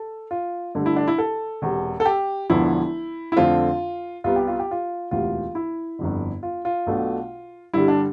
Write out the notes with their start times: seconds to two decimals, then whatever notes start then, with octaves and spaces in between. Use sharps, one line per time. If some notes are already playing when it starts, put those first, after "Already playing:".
Already playing: A4
0.31 F4
0.75 G2 D3 A3
0.86 E4
0.96 D4
1.08 E4
1.18 A4
1.62 E1 E2 C3
2.00 A4
2.05 G4
2.50 E1 E2 D3 F3 B3 E4
3.32 E4
3.37 F2 D3 A3 C4 F4
4.24 C2 C3 G3 B3 F4
4.36 G4
4.47 F4
4.59 G4
4.71 F4
5.11 E1 D2 C3 E3 F4
5.55 E4
5.99 G1 F2 D3
6.43 F4
6.65 F4
6.86 B1 B2 A3 D4
7.74 G2 D3 G3 E4
7.88 D4